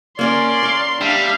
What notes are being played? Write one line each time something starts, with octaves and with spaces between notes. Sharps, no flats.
A#3 C#4 A#4 D5 C6
A#4 F5
G3 D4 E5 F5